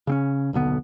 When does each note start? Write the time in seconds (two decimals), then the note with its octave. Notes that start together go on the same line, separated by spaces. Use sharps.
0.07 C#3 C4 C#4
0.53 D#1 B1 D3 B3